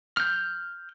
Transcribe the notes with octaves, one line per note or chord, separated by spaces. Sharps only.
F6 G6